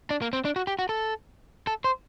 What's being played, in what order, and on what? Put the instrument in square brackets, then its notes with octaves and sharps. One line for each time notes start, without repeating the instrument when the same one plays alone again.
[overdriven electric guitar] D4
A#3
C4
D4
F#4
G4
F#4
A4
A4
C5